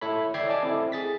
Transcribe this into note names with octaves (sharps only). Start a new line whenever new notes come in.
E4 A4 C#5 B5
C#5 D5 E5 G5 G#6 C7
D5 D#5 G#5 A5 D6
C4 E4 A4
G#4 A6 B6